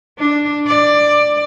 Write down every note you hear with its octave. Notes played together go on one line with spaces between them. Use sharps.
D4
D5